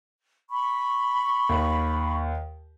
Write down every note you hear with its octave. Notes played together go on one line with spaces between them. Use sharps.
B5 C#6
D#2